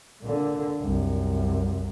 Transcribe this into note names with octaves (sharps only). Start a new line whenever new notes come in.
A#2 D3
C2 F#2